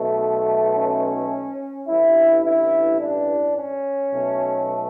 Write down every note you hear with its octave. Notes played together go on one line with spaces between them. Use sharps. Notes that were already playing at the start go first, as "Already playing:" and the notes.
Already playing: B1 B2 A3
C#4
A1 G2 E3 E4
E4
D4
C#4
B1 B2 A3